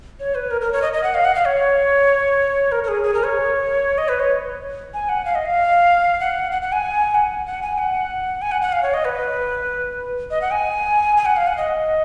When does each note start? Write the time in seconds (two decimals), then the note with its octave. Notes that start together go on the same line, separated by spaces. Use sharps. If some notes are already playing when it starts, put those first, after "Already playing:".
0.20 C#5
0.35 B4
0.51 A#4
0.61 A#4
0.72 C#5
0.82 D#5
0.93 D#5
1.04 F#5
1.14 F5
1.25 F#5
1.35 F5
1.45 C#5
2.72 A#4
2.84 A#4
2.88 G#4
3.04 G#4
3.14 A#4
3.25 C#5
3.98 D#5
4.09 B4
4.20 C#5
4.94 G#5
5.09 F#5
5.25 F5
5.35 D#5
5.46 F5
6.20 F#5
6.52 F#5
6.62 F#5
6.72 G#5
7.14 F#5
7.46 F#5
7.62 G#5
7.78 F#5
8.42 G#5
8.52 F#5
8.62 F#5
8.72 F5
8.83 C#5
8.94 D#5
9.05 B4
10.31 D#5
10.42 F#5
10.51 G#5
11.17 G#5
11.25 F#5
11.37 F5
11.47 F#5
11.57 D#5